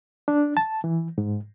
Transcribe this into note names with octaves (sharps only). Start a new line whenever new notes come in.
D4
A5
E3
G#2